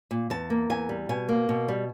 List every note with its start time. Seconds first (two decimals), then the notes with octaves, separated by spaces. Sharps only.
0.11 A#2
0.30 E2 A5
0.50 A#3
0.70 E2 G#5
0.89 G3
1.09 B2 G#5
1.29 A#3
1.49 B2
1.68 G3